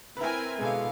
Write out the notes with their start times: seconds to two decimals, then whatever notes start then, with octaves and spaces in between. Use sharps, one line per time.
0.17 C4 E4 A#4 B4 G#5
0.58 B2 D3 G#3 F5